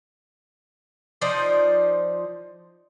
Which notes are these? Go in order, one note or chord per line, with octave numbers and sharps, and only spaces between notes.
F3 D#4 C5 D5